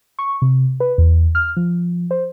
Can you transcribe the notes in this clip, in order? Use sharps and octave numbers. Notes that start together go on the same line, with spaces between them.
C#6
C3
B4
E2
F6
F3
C5